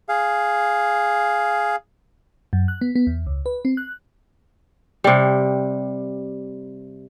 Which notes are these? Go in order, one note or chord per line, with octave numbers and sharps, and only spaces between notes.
G#4 F5
F#2
F#6
B3
B3
E2
C#2
B4
C4
F#6
C3 G3